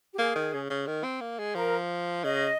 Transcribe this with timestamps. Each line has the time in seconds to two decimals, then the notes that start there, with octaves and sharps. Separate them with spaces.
0.13 G4
0.18 A#3 G#4
0.35 D#3
0.54 C#3
0.70 C#3
0.87 D#3
1.04 C4
1.21 A#3
1.39 G#3
1.55 F3 A#4
2.24 C#3 D#5